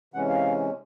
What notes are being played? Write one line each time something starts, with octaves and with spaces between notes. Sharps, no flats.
C3 E3 G#3 C#4 F#5
F5